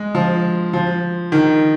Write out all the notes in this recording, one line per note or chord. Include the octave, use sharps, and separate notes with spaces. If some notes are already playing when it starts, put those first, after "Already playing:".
Already playing: G#3
F3
F3
D#3